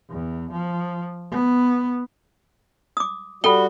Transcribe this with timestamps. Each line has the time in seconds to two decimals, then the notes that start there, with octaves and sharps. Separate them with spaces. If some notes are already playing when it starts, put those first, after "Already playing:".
0.10 E2
0.52 F3
1.31 B3
2.97 D6 D#6
3.44 G3 F#4 A4 G5 B5 G7